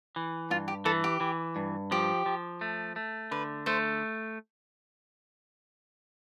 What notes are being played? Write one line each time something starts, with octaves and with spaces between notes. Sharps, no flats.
E3
G2 F4
G4
E3 A4
G4
E3
G2
F3 G4
F3
A3
A3
D3 B4
A3 C5